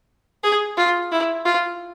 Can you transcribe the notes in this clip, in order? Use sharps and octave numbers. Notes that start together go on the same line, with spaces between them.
G#4
F4
E4
F4